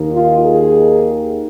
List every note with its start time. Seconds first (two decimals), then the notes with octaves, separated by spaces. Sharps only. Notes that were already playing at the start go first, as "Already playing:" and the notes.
Already playing: D#2 D#3
0.13 F4
0.43 G#4